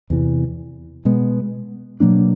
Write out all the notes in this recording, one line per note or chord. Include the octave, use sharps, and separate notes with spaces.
E2 C3 E3
B2 G#3 B3
B2 F#3 A#3 D4